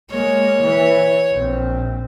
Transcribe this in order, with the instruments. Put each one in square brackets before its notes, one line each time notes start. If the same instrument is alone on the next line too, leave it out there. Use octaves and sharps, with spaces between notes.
[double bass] G#3 A#3 [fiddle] C#5
[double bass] E3
A#1 C4